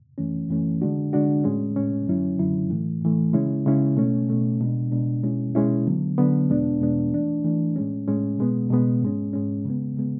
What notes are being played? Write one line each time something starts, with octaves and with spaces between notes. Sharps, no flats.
F#2 E3 A3 C#4
F#2 E3 A3 C#4
D3 G#3 D4 F#4
D3 G#3 D4 F#4
A2 G#3 C#4
A2 G#3 C#4
F#2 D3 F#3 C#4 E4
F#2 D3 F#3 C#4 E4
A2 E3 A3
A2 E3 A3
C#3 G#3 C#4 E4
C#3 G#3 C#4 E4
B2 A3 C#4
B2 A3 C#4
B2 G#3 D4
B2 G#3 D4
B2 G#3 C#4 E4
B2 G#3 C#4 E4
D3 F#3 B3
D3 F#3 B3
E2 B2 G#3 B3 D4
E2 B2 G#3 B3 D4
E3 A3 D4
E3 A3 D4
A2 G#3 C#4
A2 G#3 C#4
B2 G#3 B3
B2 G#3 B3
G#2 G#3 C#4
G#2 G#3 C#4
C#3 G#3 B3
C#3 G#3 B3